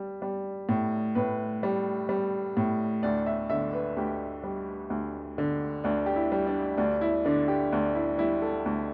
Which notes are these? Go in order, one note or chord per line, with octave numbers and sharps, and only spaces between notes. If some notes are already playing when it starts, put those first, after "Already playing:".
Already playing: G3
G3
A2
A2 B4
G3
G3
A2
D2 D5
E5
D3 E5
B4
D2 G4
G3
D2
D3
D2 D4
G4
E4
G3
D4
D2 D4
E4
D3 D4
G4
D2 D4
E4
G3 E4
A4
D2